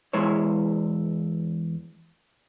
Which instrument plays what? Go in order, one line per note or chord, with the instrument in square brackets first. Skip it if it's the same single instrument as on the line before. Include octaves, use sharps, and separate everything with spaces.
[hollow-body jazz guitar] E2 G#3 E4 C5 C#5